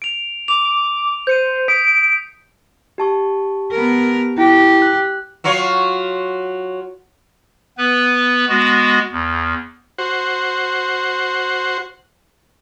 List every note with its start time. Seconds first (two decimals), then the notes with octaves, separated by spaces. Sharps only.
0.02 D7 F7
0.48 D6 F7
1.27 C5 G6 C#7 D#7
1.68 D#6 B6 D7
2.98 G4 A5 C#6
3.71 B3 A#4
4.38 E4 G4
4.82 F#6
5.44 F#3 F4 C#5
7.78 B3 B4
8.49 G#3 B3 F#4
9.12 E2
9.98 F#4 C5